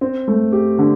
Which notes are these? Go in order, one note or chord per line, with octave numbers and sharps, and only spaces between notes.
C4
A3
G4
D3